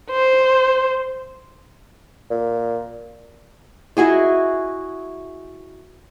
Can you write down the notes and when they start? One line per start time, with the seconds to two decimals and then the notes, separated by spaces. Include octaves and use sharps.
0.11 C5
2.31 A#2
3.97 E4 F#4 G#4 D#5